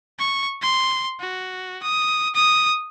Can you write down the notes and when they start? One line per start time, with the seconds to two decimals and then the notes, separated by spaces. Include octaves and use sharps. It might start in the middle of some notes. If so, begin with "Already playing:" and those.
0.19 C#6
0.62 C6
1.20 F#4
1.83 D#6
2.35 D#6